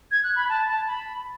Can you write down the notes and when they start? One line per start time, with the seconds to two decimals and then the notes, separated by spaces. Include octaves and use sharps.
0.11 G#6
0.24 F#6
0.36 B5
0.49 A5
0.68 A5
0.88 B5